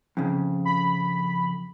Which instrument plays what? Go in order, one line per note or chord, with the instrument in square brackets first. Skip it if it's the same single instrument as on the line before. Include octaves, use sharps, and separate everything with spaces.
[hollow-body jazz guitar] F2 C#3
[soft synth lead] B5